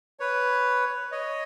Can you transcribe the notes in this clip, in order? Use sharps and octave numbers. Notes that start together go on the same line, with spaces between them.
B4 C#5
C#5 D#5